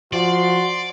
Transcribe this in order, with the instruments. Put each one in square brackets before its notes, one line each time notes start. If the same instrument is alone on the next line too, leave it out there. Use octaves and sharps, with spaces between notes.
[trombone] F3 [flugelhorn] F#4 [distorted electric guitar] D5 [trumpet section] C6